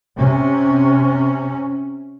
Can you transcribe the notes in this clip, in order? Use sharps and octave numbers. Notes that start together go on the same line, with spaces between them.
C3 C#4